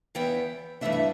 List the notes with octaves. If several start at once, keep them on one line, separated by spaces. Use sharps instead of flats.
E2 E3 B3 G5
G2 E3 A3 D4 E5
E5